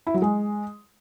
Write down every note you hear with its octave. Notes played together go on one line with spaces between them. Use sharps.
E4
F#3
G#3